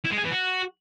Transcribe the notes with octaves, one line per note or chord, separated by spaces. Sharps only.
E4
G#3
G#4
E3
F#4